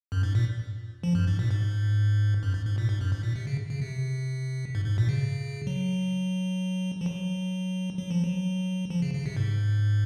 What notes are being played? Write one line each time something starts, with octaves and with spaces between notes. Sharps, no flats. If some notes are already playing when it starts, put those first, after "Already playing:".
F#2
G#2
A#2
F3
F#2
G#2
A#2
G#2
F#2
G#2
G#2
A#2
G#2
F#2
G#2
A#2
C3
C#3
C#3
C3
G#2
G#2
A#2
C#3
F#3
F3
F#3
F#3
F3
F#3
F3
C#3
C#3
C3
G#2